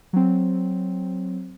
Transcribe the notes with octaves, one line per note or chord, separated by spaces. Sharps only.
F#3 C4